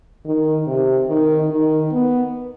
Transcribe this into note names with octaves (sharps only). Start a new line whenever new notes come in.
D#3
C3
D#3
D#3
B3